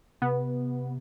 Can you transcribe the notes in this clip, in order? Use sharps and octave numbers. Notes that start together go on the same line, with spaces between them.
C3 B3